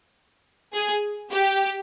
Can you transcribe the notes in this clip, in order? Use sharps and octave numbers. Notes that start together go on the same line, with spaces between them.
G#4
G4